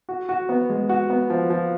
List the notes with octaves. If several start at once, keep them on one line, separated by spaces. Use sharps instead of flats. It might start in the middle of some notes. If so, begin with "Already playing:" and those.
F#4
F#4
B3
G#3
F#4
B3
F3
F3